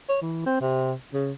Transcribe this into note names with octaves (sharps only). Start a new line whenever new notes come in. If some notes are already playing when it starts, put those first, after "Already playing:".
C#5
E3
C4
C3
C#3